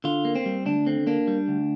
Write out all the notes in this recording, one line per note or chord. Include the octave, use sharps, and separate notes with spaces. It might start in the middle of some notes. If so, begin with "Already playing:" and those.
D3 F4
A#3
C4
G3
D2 D4
D3 C4
A#3 D4
G3
D2